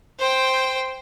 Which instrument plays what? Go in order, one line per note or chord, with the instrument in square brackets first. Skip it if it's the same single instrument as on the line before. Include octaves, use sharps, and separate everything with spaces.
[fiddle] C5 G5